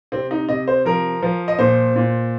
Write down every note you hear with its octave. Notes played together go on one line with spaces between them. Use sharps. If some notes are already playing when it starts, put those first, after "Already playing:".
C3 C4
D#4
C3 D#5
C5
F3 A#4
F3
D#5
A#2 C5
A#2